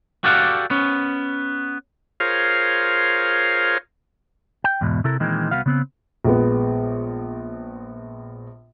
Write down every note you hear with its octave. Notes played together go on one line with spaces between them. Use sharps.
F#4 G4 A4 D5 F5 F#5
B3 C#4
F4 G#4 A#4 C5 C#5 F5
G5
E2 G#2 B2
C3 E4 A4 A#4
A#2 D#3 E3 G#3 C4
C2 B3 F#4 F5
C#3 B3 C4
A#1 G#3 B3